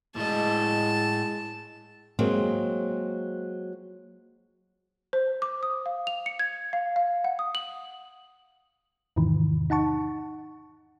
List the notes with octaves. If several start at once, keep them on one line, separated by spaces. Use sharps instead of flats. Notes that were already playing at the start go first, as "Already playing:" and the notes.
A2 G#3 D#5 A5
F#3 G#3 A#3 C4
C5
D6
D#6
F5
F7
C#7
G#6
F5
F5
F#5
D#6
F#7
E2 G#2 C3 D#3 E3
D#4 F#5 A5 C#6